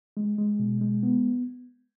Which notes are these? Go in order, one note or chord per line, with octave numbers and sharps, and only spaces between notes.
G#3
G#3
B2
G#3
B3